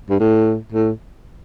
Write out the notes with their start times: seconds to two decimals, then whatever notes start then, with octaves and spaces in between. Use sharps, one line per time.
0.10 G2
0.20 A2
0.72 A2